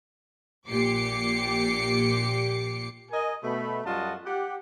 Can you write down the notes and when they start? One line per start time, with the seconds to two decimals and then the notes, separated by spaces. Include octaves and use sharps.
0.68 A#1 A#2 G4 D6 C7 C#7
3.11 A#4 D#5 G#5
3.44 B2 A3 B5
3.85 F#2 G3 F4 F#4 D#5 A5
4.25 G4 F#5